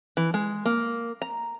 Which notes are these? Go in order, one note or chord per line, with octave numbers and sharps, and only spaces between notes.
E3
G#3
A#3
A#5